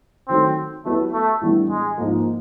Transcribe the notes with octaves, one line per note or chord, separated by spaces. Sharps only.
D#3 F#3 A3 C4
F#3 A3 B3 E4 G4 B4
A3
A2 E3 G3 B3 D4
G#3
G#2 F3 A#3 D#4